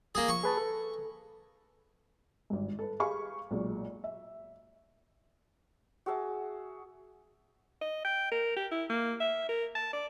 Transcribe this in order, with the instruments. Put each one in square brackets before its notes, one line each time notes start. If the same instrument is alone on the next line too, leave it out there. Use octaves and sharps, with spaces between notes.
[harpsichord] A#3 G#4
[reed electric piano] F3 [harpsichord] C#6
[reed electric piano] G#4 B4 A5
A4
[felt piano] G#1 G2
A4 B4
G4 G#4 F5 B5 C#6
B1 A#2 G#3
E5
[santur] F#4 G#4 E5 A5
[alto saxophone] D#5
G5
A#4
G4
E4
A#3
E5
A#4
A5
D5